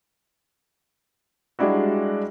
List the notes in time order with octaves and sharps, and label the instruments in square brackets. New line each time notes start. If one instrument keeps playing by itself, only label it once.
[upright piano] G3 G#3 D4 E4 F#4